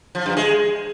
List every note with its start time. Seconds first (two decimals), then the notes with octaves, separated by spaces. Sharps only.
0.15 F3
0.26 G2
0.37 G#3